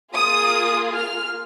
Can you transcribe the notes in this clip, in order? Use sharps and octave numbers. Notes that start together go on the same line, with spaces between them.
A#3 F4 G#4 D#6
F6